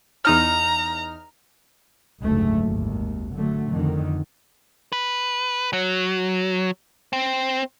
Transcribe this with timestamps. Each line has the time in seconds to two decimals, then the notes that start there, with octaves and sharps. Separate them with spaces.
0.25 E2 D#4 A#5 F6
2.20 F#1 D2 G#2 A3
2.62 G#1 D#2
3.33 D3 F#3 A3
3.69 F2 D3 D#3
4.93 B4
5.73 F#3
7.13 C4